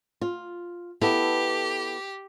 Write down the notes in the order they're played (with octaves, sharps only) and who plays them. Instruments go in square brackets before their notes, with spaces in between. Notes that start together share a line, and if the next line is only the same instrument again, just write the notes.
[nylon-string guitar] F4
[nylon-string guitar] B3 E4 A4 [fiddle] G4